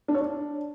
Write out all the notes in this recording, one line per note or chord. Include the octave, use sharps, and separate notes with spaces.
D4
C#5
D4